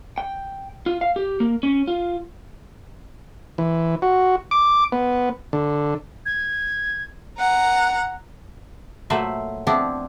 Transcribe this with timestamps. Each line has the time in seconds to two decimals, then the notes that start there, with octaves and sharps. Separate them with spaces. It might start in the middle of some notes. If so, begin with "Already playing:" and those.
0.18 G5
0.86 F4
1.01 F5
1.16 G4
1.40 A#3
1.63 C#4
1.88 F4
3.58 E3
4.02 F#4
4.51 D6
4.92 B3
5.53 D3
6.26 G#6
7.39 F#5 A#5
9.10 A#2 F#3 A3 B4 C5 E5
9.67 F3 B3 C4 D4 E4